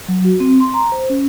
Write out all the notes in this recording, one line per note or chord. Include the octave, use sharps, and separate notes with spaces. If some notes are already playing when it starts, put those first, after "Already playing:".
F#3
F#4
C4
C6
A#5
C5
C#4